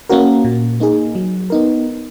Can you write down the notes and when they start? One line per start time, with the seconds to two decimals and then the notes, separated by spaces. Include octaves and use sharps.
0.09 A#3 C#4 F#4 A#4
0.44 A#2
0.80 A#3 D#4 G#4
1.15 F#3
1.50 B3 D#4 A#4